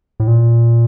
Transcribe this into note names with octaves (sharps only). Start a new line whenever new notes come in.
A2
A#2